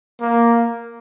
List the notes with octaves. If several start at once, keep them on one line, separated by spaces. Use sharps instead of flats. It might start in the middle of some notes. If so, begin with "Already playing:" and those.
A#3